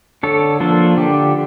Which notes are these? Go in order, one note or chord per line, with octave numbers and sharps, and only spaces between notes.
D3 A4 C#5
F3 A#3 D4 F4 A4
D3 G4